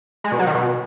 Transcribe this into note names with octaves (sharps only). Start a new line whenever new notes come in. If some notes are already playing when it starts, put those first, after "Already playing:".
G#3
B2
F#3
D#3
B2